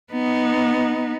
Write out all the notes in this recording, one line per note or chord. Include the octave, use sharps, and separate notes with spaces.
B3 D#4